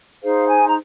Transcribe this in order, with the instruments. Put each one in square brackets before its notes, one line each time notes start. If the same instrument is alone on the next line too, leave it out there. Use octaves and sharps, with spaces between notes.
[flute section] D#4 G#4 C5 F5
G#5
A#5